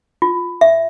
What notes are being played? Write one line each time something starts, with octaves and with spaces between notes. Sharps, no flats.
F4
E5